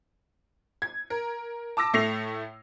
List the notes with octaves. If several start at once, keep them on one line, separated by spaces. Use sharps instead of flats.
G#6
A#4
A5 D6 E6 A#6
A2 A3 A#6 C7 F7